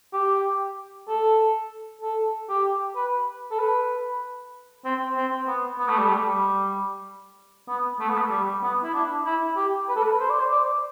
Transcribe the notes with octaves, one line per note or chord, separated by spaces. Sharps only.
G4
A4
A4
G4
B4
A4
B4
C4
C4
B3
B3
A3
G3
A3
G3
B3
A3
B3
A3
G3
B3
E4
D4
E4
G4
B4
A4
B4
C5
D5
C5
D5